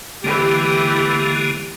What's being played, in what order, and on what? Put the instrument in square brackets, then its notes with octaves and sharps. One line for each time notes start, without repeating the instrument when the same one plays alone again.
[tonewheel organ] D3 G#3 A#3 [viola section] E3 G4